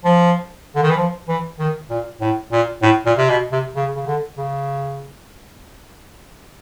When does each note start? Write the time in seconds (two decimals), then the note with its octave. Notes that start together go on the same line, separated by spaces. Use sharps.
0.04 F3
0.75 D3
0.83 D#3
0.90 E3
0.97 F3
1.28 E3
1.59 D#3
1.90 A#2
2.21 A2
2.52 A#2
2.82 A2
3.06 A#2
3.18 C3
3.29 B2
3.52 C3
3.75 C#3
3.95 C#3
4.06 D3
4.37 C#3